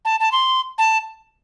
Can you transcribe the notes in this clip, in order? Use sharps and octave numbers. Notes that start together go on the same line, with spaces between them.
A5
A5
C6
A5